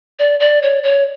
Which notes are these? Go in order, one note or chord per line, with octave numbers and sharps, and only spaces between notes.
D5
D5
C#5
C#5